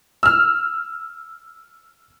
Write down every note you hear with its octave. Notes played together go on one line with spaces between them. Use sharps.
E6 F6